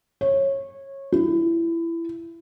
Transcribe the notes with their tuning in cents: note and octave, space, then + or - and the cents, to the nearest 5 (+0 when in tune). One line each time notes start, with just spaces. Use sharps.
C#5 -20
E4 +20